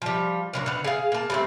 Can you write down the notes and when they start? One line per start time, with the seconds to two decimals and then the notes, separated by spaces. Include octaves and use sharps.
0.02 F3 G3
0.53 D3 F#3 A#3
0.66 D3 B3
0.84 G#4 F5
1.12 A#3 A5
1.30 G3 A3 C4